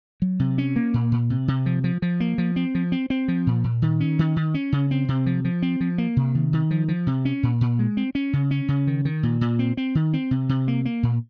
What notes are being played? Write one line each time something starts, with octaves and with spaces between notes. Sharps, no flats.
F#3
C3
C#4
A#3
A#2
A#2
C3
C3
F3
F3
F3
A#3
F3
C4
F3
C4
C4
F3
A#2
A#2
D#3
C#4
D#3
D#3
C#4
C#3
C4
C3
F3
F3
C4
F3
A#3
C3
D#3
D#3
F3
F3
C3
C#4
A#2
A#2
G#3
C4
C#4
C#3
C#4
C#3
D#3
D#3
A#2
A#2
C4
C4
D#3
C4
C3
C3
A#3
A#3
A#2